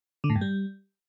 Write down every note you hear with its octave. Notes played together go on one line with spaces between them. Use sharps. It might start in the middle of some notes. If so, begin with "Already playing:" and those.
D3
A2
G2
G3